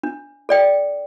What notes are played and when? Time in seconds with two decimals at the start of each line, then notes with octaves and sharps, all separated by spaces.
0.03 D4
0.49 A4 D5 G5